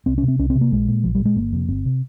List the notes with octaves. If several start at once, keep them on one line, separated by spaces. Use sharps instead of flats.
C2 C4
C#4
C3
C4
C2 C#4
C4
C3
A#3
A#1 G#3
A#2
A#1 F3
G3
A#2
G#3
G1 A#3
F2 C3
G1 C4
C3